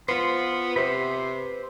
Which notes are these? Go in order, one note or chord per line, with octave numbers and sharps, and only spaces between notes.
B3 F4 C5
C3 B4 C5